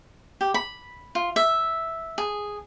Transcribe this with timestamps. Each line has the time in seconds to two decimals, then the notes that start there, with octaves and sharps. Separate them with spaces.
0.41 G4
0.54 B5
1.15 F4
1.36 E5
2.18 G#4